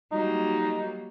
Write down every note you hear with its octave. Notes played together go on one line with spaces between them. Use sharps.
F#3 G3 A#3 D#4